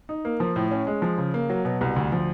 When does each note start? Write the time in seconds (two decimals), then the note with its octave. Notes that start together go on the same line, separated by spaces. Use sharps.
0.09 D#4
0.25 A#3
0.40 F3
0.56 A2
0.71 C#4
0.87 G#3
1.02 F3
1.18 C#3
1.34 A#3
1.49 F#3
1.65 B2
1.81 C2
1.96 D2
2.12 F3